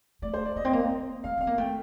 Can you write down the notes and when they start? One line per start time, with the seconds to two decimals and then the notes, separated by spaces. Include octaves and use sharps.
0.22 A3 D5
0.34 C5
0.45 D5
0.56 A#3 D#5
0.65 C4
0.73 A#3
0.90 A#3
1.24 A3 F5
1.38 C4 F5
1.47 A#3
1.58 A3 G5